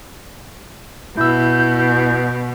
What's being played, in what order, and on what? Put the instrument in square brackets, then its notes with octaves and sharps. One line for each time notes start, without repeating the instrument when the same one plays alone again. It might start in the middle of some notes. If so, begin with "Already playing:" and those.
[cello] B2 [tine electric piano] E4 E6 [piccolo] G6